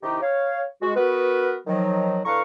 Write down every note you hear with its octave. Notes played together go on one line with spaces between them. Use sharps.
C3 D#3 D#4 E4 G4
C#5 F5
G#3 F#4
B3 F#4 A#4 B4
D#3 F3 F#3
A2 D3 B4 F5 A#5 C#6